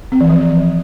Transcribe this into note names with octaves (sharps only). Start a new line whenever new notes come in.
C4
E3
F3